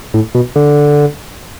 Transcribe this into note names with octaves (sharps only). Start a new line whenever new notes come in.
A2
B2
D3